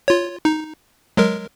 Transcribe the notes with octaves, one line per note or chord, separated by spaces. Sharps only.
F4 C#5
D#4
F#3 G#3 A#4